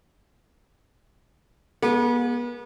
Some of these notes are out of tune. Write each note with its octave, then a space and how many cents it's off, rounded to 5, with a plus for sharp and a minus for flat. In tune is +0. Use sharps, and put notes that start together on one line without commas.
G#3 +0 B3 -40